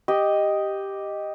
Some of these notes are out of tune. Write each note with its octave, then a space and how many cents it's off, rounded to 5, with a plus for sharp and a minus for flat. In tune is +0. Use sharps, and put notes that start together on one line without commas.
G4 +0 D#5 +0